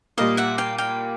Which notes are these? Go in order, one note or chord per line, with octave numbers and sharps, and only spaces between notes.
A#2 G3 A#3 D#5 F5
E5 F#5
F5 G5
F5 G5